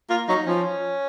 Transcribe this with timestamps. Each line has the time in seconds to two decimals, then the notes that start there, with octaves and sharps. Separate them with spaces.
0.09 A#3 F4
0.28 F#3 D#4
0.47 F3 C#4